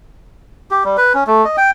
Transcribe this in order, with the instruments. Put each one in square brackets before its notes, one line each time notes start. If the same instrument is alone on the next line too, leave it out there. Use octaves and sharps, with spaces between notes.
[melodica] G4
G3
B4
C#4
A3
D#5
G5